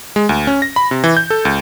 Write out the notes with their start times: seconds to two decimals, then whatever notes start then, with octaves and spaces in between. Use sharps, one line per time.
0.16 G#3
0.29 D2
0.47 C#4
0.62 A#6
0.76 B5
0.91 C3
1.04 E3
1.17 G6
1.30 A4
1.45 C#2